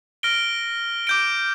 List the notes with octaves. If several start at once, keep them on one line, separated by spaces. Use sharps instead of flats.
F6 A#6 D7 G7
D6 G6 D7